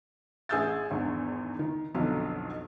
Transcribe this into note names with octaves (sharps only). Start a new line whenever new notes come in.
A1 G#4 E5 E6 G6 A6
G#1 E2 G2
D#3
B1 F2 B2 D3 F#3